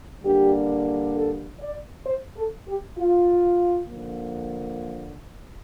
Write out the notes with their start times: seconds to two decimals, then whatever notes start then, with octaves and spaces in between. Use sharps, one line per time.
0.23 D3 G3 A#3 D4 G4
1.15 A4
1.60 D5
2.06 C5
2.36 A4
2.67 G4
2.98 F4
3.89 D3 F3 A#3